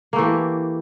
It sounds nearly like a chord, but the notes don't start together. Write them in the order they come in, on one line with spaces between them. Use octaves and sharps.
A#3 A3 E3 G4